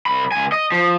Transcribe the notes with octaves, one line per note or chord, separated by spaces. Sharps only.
C2 B5
C#2 G#5
D#5
F3